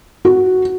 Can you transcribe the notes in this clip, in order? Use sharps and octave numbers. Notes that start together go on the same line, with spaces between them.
F#4